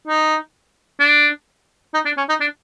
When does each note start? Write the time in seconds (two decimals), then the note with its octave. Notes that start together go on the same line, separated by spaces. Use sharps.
0.08 D#4
1.00 D4
1.94 D#4
2.05 D4
2.17 C#4
2.29 D#4
2.41 D4